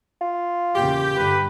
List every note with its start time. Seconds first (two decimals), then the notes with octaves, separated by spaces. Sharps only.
0.21 F4
0.76 E2 A#2 C#3 G4 G5
1.16 G2 D3 B4